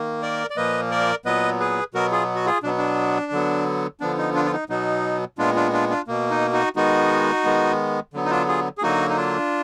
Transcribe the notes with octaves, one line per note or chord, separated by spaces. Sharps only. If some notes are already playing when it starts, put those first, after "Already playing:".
Already playing: D#3 A#3
A#4 D5
D5
A#2 F3 A#3 B4 D#5
A#4 D5
A#2 F#3 B3 B4 D#5
G#4 B4
B2 F#3 B3 F#4 A#4
F4 G#4
F#4
F4 G#4
B2 F#3 B3 D4
D4
D3 F#3 B3
D3 F3 B3 D4
D#4
D4 F4
F4
D#4
B2 F#3 B3 D#4
A#2 G#3 B3 D4 F4
D4 F4
D4 F4
D4 F4
B2 A#3
D#4
D#4 F#4
D#3 G#3 B3 D#4 F#4
D#3 G#3 B3
D3 F#3 B3
D#4
D4 F4
F4 G#4
G#4
D3 F#3 A#3 D#4 F#4
D#4
D4 F4